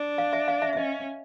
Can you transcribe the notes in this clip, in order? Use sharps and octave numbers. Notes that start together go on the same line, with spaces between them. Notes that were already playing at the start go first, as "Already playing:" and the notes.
Already playing: D4
F5
E5
F5
E5
E5
C#4 D#5